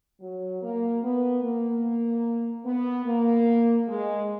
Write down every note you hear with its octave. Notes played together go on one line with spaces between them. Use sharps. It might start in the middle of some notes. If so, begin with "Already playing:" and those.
F#3
A#3
B3
A#3
B3
A#3
G#3